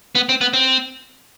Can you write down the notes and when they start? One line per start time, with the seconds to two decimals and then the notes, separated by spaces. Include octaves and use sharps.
0.15 B3
0.29 C4
0.41 B3
0.53 C4